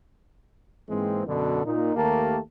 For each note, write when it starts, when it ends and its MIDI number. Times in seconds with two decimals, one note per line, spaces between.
0.89 1.24 44
0.89 1.24 52
0.89 1.24 56
0.89 1.24 58
0.89 1.24 60
1.27 1.63 42
1.27 1.63 47
1.27 1.63 50
1.65 1.95 46
1.65 1.95 63
1.96 2.38 39
1.96 2.38 57
1.96 2.38 58
1.96 2.38 67
1.96 2.38 70
1.96 2.38 81